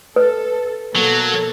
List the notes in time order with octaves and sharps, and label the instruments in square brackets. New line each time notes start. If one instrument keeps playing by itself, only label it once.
[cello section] A4 [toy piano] B4
[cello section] B2 A#3 A4 [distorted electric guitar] F#3